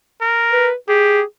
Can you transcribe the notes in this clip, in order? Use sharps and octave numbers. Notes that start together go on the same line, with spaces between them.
A#4
B4
G4 G#4